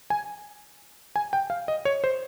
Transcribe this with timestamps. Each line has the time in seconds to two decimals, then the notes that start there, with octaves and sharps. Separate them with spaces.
0.10 G#5
1.16 G#5
1.33 G5
1.50 F5
1.68 D#5
1.85 C#5
2.04 C5